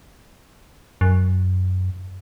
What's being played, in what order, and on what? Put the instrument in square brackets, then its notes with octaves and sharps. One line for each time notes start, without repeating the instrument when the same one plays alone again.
[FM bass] F#2